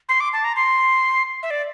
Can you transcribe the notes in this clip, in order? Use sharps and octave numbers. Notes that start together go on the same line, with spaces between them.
C6
D6
A5
A#5
C6
E5
D5